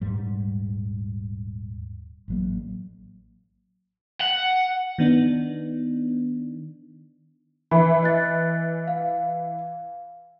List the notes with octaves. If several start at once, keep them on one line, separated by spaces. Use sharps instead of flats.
D#1 G#2 G3
A1 F#3 A#3
F#5
D#3 B3 D4 D#4
E3 B5
D#5 F#6 A6
F5